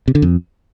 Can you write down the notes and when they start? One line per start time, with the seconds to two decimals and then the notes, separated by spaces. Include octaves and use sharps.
0.08 C3
0.15 D3
0.22 F2